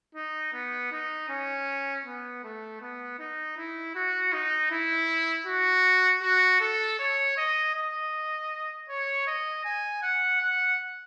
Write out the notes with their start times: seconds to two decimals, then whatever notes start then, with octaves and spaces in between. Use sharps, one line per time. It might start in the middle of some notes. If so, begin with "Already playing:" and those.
0.15 D#4
0.54 B3
0.92 D#4
1.29 C#4
2.05 B3
2.44 A3
2.81 B3
3.19 D#4
3.58 E4
3.95 F#4
4.33 D#4
4.71 E4
5.47 F#4
6.22 F#4
6.61 A4
6.99 C#5
7.37 D#5
7.75 D#5
8.89 C#5
9.27 D#5
9.65 G#5
10.03 F#5
10.41 F#5